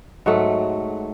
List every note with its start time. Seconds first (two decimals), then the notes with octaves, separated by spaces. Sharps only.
0.26 G#2 F#3 A3